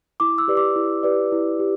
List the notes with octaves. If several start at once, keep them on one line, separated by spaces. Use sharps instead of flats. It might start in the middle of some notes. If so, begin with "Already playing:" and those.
E4 D6
E6
G4 B4 D5
D6
E4
G4 B4 D5
E4
G4